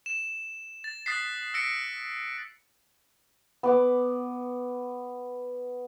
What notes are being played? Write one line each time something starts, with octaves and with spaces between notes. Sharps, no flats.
E7
A6
D#6 F#6 A6 B6 C7
E6 A#6 B6 C#7 D7
B3 D6